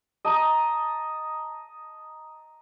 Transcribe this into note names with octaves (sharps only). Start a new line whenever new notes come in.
D#5 A5 A#5 D#6